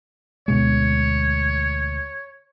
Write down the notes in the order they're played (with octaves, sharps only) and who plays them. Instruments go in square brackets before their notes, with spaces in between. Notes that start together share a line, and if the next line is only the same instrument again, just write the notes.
[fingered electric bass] D2 B2 G#3 [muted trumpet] C#5